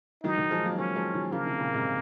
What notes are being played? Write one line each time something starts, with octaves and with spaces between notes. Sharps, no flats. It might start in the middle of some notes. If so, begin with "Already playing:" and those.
D#3 F#3 D#4
D#3 F#3
F3 G#3
F#3 A#3
F#3 A#3 C#4
F3 G#3
D#3 F#3
C#3 F3 A#3
C3 D#3
A#2 C#3
G#2 C3